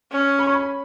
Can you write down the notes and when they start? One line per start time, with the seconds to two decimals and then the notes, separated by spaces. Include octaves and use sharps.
0.12 C#4
0.39 B5
0.47 C#6
0.54 B5